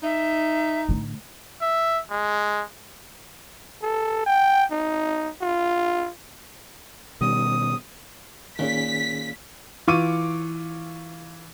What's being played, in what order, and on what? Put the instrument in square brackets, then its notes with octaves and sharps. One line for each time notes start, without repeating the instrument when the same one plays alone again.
[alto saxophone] D#4 [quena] E5
[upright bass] A2 D3
[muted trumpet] E5
G#3
[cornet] A4
G5
D#4
F4
[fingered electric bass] B2 D#3 G3 [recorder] D#6
[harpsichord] A#2 [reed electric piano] D#3 C#4 G#4 [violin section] B6
[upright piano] E3 F4 C#6 D6 D#7